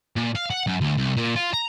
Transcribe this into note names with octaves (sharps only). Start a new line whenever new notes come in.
A#2
F5
F#5
F#2
D2
C2
A#2
F4
A#5